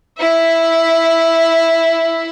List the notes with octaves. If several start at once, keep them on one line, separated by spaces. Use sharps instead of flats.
E4 E5